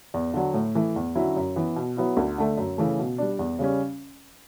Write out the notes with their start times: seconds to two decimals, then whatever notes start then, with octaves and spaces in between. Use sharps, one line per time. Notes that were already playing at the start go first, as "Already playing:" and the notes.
0.14 E2
0.34 D3 F#3
0.54 A2
0.75 E3 A3
0.96 E2
1.15 D3 F#3 C#4 E4
1.36 F#2
1.56 E3 B3
1.76 B2
1.97 F#3 B3 E4
2.17 D2
2.38 D3 A3
2.58 F#2
2.78 C#3 E3 A3
2.99 B2
3.18 G3 D4
3.39 E2
3.59 C#3 G3 C#4